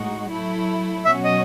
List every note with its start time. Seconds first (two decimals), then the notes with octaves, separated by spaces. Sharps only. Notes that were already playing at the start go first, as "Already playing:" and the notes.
Already playing: A2 G#3 D#4 F#4
0.30 F#3 A3 E4
1.05 B2 F#3 C#4 F#4 E5
1.24 D#5